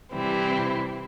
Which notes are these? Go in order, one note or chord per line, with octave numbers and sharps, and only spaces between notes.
C3 E3 G3 C4 E4